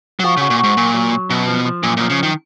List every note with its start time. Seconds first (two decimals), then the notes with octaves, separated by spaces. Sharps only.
0.20 F#3
0.24 F3 F#4
0.37 C#3 F#4
0.50 A#2
0.59 G#2 F#4
0.77 A#2 F#3
0.94 F#3
1.12 F#3
1.30 F#2 B2
1.48 F3
1.65 F3
1.83 F#2 A#2
1.97 A#2 F3
2.10 C#3
2.18 F#2 D#3